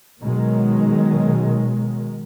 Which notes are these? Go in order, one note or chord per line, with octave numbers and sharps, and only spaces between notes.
B2 D#3 F#3 G#3